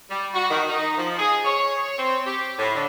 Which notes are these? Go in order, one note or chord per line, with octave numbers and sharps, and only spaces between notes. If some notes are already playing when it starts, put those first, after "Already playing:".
G3
F#4
D#3
D#4
F3
G#4
C#5
C4
G4
A2
D3